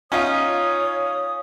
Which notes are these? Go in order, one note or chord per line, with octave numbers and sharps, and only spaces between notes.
C#4 D#4 F4 C#5 D#6